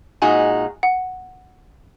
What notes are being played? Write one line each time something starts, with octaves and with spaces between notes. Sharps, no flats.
A#2 G#3 D#4 F#4 G#5
F#5